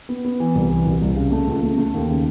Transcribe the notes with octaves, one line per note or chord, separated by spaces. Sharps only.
B3
B3
E3
C2
E3
C2
C2
C#3
A3
C#2
A3
A3
D#2
C#3